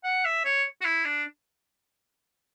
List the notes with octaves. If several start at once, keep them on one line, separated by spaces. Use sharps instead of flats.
F#5
E5
C#5
F#4
E4
D4